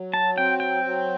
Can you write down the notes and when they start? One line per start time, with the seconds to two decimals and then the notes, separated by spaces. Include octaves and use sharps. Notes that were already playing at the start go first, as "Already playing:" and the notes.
Already playing: F#3
0.14 A5
0.37 C4 G5
0.60 G5
0.84 F#3